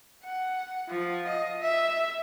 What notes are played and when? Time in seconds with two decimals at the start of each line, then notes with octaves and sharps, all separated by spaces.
0.24 F#5
0.89 F3
1.27 D#5
1.61 E5